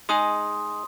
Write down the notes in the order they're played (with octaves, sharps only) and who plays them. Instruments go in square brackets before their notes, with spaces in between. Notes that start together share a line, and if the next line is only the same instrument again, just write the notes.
[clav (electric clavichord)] G#3 D#4 G#4 [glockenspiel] C6 D#6